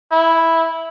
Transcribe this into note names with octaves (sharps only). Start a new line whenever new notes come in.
E4